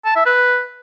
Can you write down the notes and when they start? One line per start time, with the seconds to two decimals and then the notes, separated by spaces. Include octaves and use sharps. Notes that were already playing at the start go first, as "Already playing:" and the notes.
0.05 A5
0.15 E5
0.26 B4